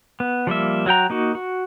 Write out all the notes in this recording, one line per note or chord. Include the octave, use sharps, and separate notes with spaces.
B3
F3 G3 A#3 E5
F#3 F#4 G5 A#5
A#3 D#4 F#4
F#4